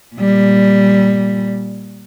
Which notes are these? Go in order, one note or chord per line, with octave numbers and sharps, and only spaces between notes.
A#2 G3